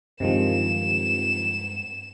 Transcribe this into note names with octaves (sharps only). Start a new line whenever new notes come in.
G2 C3 D#3 F3 G#3 E7